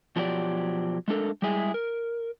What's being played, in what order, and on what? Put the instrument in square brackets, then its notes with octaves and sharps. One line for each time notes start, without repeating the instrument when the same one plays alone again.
[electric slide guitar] B2 F3 F#3 D4 G4 D5
G#3 A3 D4 A4 A#4
G3 G#3 E4 G#4 E5
A#4